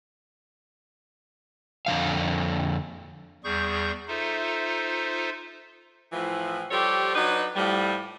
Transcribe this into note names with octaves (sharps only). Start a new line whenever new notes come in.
F2 D3 F3 F5
E2 G3 G#4 C#6 G6
D#4 F4 A4 C5 E5
A2 E3 F3
F3 G3 G4 A4 C#5
F#3 D4 D#4 B4
A2 F3 G3